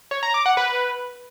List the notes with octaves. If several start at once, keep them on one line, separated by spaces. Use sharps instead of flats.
C#5
A#5
D6
F#5
B4